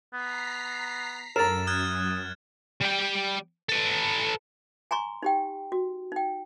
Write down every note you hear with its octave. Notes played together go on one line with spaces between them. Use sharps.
B3 A#5 B6 C7
F#2 A4 A#4 A#5 A6 E7
D#6 F6 F#6 G#6
G3 G5
A4 B4
G#5 A#5 C6 C#6
D#4 G4 G5
F#4
D#4 G5